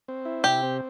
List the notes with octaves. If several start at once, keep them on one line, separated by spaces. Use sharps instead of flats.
C4
E4
C3 G4
C4